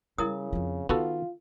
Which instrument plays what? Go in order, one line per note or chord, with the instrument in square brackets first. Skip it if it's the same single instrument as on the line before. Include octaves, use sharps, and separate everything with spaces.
[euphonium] C#3 [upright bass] G3 [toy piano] E4 A#4 D#6
[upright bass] F2 F3
[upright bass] D#3 [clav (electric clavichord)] B3 F#4 A4 [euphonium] F4